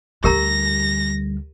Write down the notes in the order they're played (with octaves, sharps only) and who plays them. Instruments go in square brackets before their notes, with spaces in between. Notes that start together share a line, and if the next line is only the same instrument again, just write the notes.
[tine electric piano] D2 [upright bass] D3 G3 [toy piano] G4 A#4 A#5 [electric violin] A#6